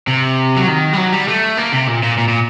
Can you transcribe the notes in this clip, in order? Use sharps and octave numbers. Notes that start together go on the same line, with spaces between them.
C3
F#3
D#3
G3
F#3
G3
A3
A#3
C3
A#2
A#2
A#2
A#2